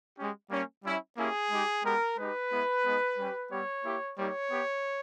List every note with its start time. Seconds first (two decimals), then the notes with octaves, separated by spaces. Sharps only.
0.17 G#3 C#4 G4
0.50 G3 A#3 C#4
0.84 G3 C#4 E4
1.17 A#3 C#4 E4 G4 G#4
1.51 G#3 D#4 G4
1.84 G#3 B3 G4 A#4
2.18 G#3 D#4 G4 B4
2.51 G#3 B3 E4
2.85 G#3 B3 D#4
3.18 G3 C#4 G4
3.51 G3 B3 G4 C#5
3.85 A#3 E4 G4
4.18 G3 A#3 D#4 G4 C#5
4.51 B3 G4